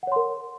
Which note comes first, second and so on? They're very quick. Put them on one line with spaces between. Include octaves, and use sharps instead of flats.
F#5 C#5 C6 A#4